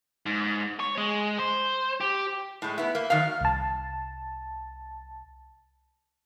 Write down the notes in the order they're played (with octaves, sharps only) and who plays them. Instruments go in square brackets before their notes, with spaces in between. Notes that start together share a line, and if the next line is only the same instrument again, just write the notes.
[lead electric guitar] G#2
C#5
G#3
C5
G4
[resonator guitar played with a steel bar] A2 G#3
B3 E4
A#3
D#3 F#3 F5
[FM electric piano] C2 A5